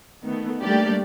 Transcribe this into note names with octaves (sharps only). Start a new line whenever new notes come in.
D#3 A3 B3
G3 A3 A#3 D4 G4 D5